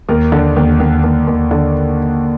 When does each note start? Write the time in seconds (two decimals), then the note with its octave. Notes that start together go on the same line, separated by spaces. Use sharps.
0.09 D#2 A#4
0.32 D3
0.56 D#2
0.80 D#2
1.04 D#2
1.27 D#2
1.51 D3